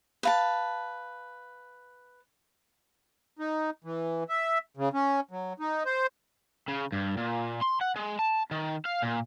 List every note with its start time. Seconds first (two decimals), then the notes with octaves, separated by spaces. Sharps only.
0.23 B4 F5 A5
3.39 D#4
3.84 E3
4.29 E5
4.77 C#3
4.93 C#4
5.31 F#3
5.60 D#4
5.85 C5
6.68 C#3
6.92 G2
7.17 A#2
7.61 C6
7.81 F#5
7.96 G#3
8.19 A5
8.51 D#3
8.85 F5
9.02 A#2